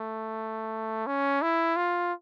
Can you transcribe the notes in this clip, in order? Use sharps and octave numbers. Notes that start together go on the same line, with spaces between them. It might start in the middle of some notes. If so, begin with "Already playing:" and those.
Already playing: A3
C#4
E4
F4